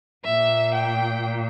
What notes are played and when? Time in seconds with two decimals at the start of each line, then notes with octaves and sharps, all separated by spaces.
0.24 A#2 E5
0.74 G5